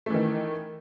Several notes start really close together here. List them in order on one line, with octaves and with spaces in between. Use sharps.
A3 E3 D#3